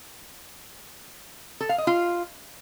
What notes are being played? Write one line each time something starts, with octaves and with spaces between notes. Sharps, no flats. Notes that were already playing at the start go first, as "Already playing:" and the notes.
A4
F5
D#5
F4